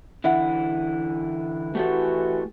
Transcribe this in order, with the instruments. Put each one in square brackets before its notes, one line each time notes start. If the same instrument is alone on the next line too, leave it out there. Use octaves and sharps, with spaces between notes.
[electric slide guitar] D3 E3 E4 [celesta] E5 F#5
[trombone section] E3 F#4 [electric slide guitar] A3 G4 A4